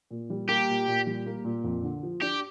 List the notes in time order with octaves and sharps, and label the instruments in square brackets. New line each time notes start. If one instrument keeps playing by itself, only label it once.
[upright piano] A#2
G3
[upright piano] A#3 [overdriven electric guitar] G4
[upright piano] A#2
A#2
G3
A#3
A#2
F2
D3
F3
[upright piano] D4 [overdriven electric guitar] G4